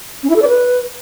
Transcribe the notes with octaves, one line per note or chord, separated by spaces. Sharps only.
C#4
E4
A4
D5
B4